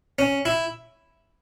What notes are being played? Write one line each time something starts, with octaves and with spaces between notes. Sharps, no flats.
C#4
E4